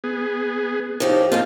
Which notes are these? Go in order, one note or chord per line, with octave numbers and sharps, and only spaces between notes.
B3 G#4
A2 F3 D#4 G4
G#3 A#3 C4 D#4 F4 A5